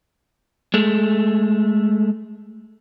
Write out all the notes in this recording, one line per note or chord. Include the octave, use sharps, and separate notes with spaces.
G#3 A3